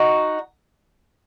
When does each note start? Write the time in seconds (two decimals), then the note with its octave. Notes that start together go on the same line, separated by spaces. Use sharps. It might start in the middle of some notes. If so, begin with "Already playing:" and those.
Already playing: D#4 F#4